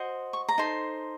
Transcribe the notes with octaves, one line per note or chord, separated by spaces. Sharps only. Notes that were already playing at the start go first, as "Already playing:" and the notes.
Already playing: F#4 C5 D#5
C#6
A#5
D#4 A4 C5 C6